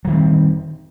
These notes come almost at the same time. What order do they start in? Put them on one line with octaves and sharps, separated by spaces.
F#3 D#3 G3 C4